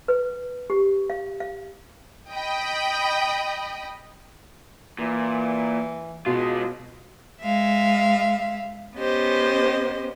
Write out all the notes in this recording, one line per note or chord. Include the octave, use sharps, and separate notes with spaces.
B4
G4
F5
F5
D#5 G5 B5
A#2 E3
B2 G#3 F4
G#3 E5 F5
B3 C#4 G4 C5 D#5